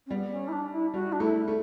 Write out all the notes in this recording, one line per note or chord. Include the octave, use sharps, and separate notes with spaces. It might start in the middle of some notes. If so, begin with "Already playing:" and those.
C#4
G3 B3
C#4
E4
D4
E4
G3 F#4
D4
A3 E4
A3